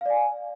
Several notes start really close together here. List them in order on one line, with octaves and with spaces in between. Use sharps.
F5 D5 G#5